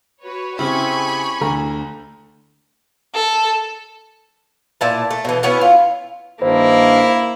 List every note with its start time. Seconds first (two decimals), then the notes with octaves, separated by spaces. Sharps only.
0.22 F#4 B4 C#5
0.59 C#3 C4 E4 G4 G#5 B5 C#6
1.41 D2 A3 A#5
3.14 A4
4.81 A#2 E4 A5
5.11 A3
5.25 B2 E3
5.43 B3 C#4 E4 F#4
5.61 F4
6.42 G2 D#3 A#3 E4 C5